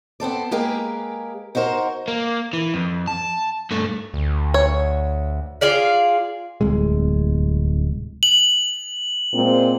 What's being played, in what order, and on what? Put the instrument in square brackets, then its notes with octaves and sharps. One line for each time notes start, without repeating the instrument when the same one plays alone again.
[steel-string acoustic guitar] B3 C4 A4 D5
G#3 A#3 G4 G#4 A#4 B4
D#4 F#4 A#4 C5
[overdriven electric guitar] A#3
E3
F2
A5
G2 A3
[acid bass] D2
[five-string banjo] C#5
[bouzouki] F4 G#4 D5 F5
[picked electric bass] D1 C2 G#3
[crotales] F#7
[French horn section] A#2 G#3 C4